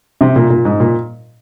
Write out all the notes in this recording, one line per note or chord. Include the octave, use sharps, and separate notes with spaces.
C3
A#2
A#2
G#2
A#2